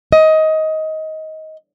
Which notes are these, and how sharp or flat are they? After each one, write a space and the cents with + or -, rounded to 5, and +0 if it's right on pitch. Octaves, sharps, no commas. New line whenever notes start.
D#5 +20